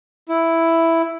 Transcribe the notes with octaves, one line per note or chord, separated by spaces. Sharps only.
E4